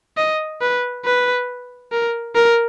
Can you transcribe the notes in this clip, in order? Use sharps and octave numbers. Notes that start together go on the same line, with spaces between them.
D#5
B4
B4
A#4
A#4